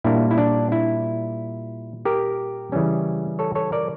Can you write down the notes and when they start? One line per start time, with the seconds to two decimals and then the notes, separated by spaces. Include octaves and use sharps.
0.04 A#2 G3 A#3 D4 E4
0.31 E4
0.38 D4
0.72 E4
2.05 G4 A#4
2.72 C#3 E3 G3 C#4
3.39 A4 C#5
3.55 A4 C#5
3.72 A#4 D5